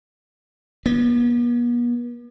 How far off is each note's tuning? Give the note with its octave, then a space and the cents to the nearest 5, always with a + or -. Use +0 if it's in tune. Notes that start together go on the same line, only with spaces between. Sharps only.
B3 -45